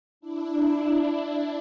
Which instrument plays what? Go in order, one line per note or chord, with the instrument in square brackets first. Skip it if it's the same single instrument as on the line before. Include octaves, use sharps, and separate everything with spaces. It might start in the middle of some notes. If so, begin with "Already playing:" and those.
[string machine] D4 E4